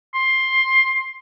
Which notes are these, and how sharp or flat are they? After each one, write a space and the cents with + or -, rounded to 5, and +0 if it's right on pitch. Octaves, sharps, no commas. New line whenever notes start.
C6 +15